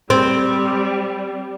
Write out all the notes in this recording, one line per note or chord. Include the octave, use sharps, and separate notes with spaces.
G3 C4